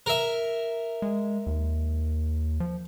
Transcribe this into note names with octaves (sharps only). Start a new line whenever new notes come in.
A#4 E5
G#3
D#2
F3